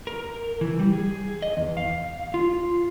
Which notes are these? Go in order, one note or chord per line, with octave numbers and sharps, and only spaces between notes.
A#4
E3
G3
G#4
D#5
E2
F5
F4